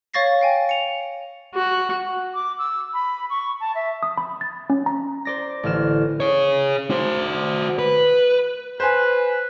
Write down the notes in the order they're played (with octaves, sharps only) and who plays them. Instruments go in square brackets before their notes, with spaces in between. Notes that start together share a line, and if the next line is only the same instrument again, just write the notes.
[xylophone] C#5 F5 C#6 A6 A#6 C7
F5 G5 G#5
C#7 F7
[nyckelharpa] F#4
[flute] D6
E6
B5
C#6
A5
E5
[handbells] D#6
B5
A6
C#4
A#5
[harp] C5 D5 A#6
A1 D3 F6 E7
[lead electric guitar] G#4 C#5
F#4 C5
B4
[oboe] B4 [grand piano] C5 G#5